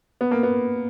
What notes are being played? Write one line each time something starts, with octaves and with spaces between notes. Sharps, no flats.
B3
A#3
B3